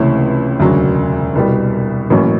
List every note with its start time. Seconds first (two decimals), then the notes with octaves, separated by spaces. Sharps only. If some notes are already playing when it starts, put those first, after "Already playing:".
Already playing: C#2 C3 E3 A3 C#4
0.59 E1 D2 C#3 F#3
1.35 C2 B2 G3
2.10 A1 A2 F#3 A#3 C#4